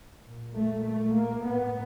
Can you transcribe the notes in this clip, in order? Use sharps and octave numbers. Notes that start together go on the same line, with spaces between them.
A#2
A3
A3
A#3
A2 B3